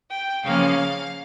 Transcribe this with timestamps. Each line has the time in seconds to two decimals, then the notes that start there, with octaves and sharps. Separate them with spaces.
0.10 G5
0.44 C#3 F3 A#3 C#4 F5